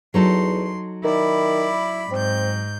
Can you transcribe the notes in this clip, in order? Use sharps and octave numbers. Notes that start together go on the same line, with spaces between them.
E2 F#3 D#4 A4 C6
D#3 E4 D5 B5
G#2 C4 G6